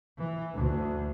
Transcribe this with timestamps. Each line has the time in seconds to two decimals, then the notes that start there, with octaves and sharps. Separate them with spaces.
0.17 E3
0.54 D2